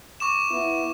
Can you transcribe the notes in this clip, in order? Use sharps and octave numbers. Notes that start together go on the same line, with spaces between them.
C#6 D6 E7
B3 E4